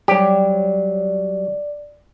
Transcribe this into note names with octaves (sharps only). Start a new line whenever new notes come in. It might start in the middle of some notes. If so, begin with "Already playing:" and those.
F#3 G3 G4 C#5 D5